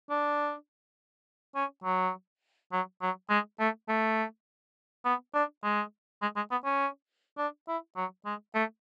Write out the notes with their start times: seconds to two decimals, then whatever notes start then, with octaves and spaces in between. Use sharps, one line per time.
0.10 D4
1.56 C#4
1.84 F#3
2.72 F#3
3.02 F#3
3.30 G#3
3.60 A3
3.89 A3
5.05 B3
5.34 D4
5.64 G#3
6.22 G#3
6.36 G#3
6.52 B3
6.65 C#4
7.38 D4
7.68 E4
7.97 F#3
8.26 G#3
8.55 A3